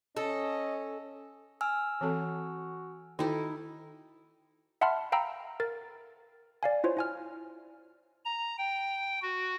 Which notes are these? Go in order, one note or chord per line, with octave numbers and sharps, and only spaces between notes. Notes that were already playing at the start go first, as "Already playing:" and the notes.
C#4 A4 D#5
G#5 E6 F6
E3 C4 F#4 A4
D#3 D#4 E4 F#4 A4 G5
E5 F#5 A5 B5 C6 F6
F5 G5 A#5 B5 E6
A#4 A6
D5 F5 G#5
E4 F4 C5 C#5
E4 G#5 F6
A#5
G5
F#4